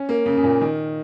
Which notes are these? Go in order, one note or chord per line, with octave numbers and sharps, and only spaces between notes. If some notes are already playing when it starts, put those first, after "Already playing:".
Already playing: C#4
A#3
C#3
C#3
A#2
D#3